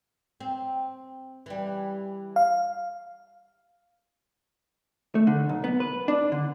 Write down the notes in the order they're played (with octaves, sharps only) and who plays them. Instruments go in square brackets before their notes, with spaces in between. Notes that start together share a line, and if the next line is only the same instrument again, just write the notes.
[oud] C4
E3 G3
[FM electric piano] F5
[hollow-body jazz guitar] A3
D3
B1
B3
B4
D4
D3